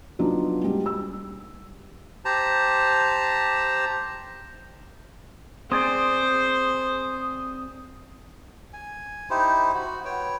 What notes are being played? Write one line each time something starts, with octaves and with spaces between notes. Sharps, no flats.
F#3 B3 D4 D#4 F4
G3 G#3
E6
G4 C5 A5 A#5
C4 G#4 C5 D5 D#6
G#5
D#4 E4 G4 C5
F#4
B4 C#5 G5